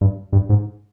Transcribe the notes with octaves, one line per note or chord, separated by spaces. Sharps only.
G2
G2
G#2